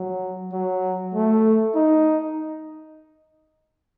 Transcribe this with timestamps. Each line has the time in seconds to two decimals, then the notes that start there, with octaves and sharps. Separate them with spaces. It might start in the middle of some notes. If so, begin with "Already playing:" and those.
Already playing: F#3
0.53 F#3
1.14 A3
1.75 D#4